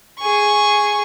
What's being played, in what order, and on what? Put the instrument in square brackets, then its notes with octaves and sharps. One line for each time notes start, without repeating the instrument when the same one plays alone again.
[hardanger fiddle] G#4 C#6